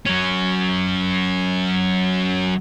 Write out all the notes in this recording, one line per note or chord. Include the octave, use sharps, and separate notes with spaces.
F#3 C#4